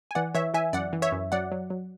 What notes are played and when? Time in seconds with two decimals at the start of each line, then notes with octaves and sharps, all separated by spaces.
0.11 G#5
0.15 E3 D5 F#5
0.35 E3 C#5 E5
0.54 E3 E5 G#5
0.73 F#2 D5 F#5
0.93 E3
1.02 C#5 E5
1.12 F#2
1.32 F#3 D5 F#5
1.52 F#3
1.70 F#3